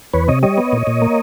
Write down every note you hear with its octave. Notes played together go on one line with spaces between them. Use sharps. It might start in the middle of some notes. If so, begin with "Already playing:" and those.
E2 B4 C#5
C3 C#5 D#5
G3 C#5 D#5
B3
A#2
A#2
A#3